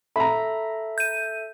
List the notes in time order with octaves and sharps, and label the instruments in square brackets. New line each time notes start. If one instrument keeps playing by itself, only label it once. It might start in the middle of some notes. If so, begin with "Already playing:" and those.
[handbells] A4 E5 [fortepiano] A#5 B5
[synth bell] G6 D#7